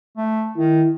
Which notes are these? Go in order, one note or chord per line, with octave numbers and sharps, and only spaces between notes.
A3
D#3 E4